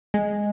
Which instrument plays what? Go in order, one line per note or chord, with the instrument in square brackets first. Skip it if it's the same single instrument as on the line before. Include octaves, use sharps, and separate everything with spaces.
[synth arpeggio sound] G#3